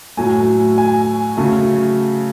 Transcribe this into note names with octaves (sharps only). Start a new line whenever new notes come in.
A2 F#3 A3 G#5
G#5
C#3 F#3 A3